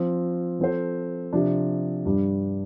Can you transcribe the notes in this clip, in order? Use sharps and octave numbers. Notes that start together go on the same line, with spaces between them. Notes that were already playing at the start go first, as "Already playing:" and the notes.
Already playing: F3 C4 F4
F3 C4 A4 C5
C3 F3 D4
G2 G3 D4